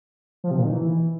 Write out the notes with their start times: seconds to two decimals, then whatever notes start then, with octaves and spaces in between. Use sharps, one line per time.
0.44 F3
0.51 C3
0.58 A#2
0.65 D#3
0.73 E3